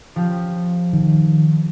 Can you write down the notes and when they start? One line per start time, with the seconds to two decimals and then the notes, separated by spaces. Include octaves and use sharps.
0.16 F3 C#4 G4
0.93 D#3